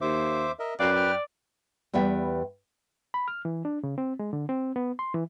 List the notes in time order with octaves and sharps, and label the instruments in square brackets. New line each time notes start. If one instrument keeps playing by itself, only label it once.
[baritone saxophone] D#2 [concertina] C5 E5 D6
[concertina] A#4 D#5 E5
[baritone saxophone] F#2 [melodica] B4 [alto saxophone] D5 [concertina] F5 G5
[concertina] G5 F6
[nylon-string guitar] E2 G3 B3 E5 G5
[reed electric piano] B5
F6
E3
D4
C#3
C4
G#3
D3
C4
B3
C6
E3